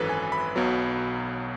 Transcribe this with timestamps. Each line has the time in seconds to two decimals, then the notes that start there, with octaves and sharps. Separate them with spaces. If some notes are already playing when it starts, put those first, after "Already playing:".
Already playing: G#1 F#2 E3 A4 B4
0.09 G#5
0.32 B5
0.56 B1 B2 F#3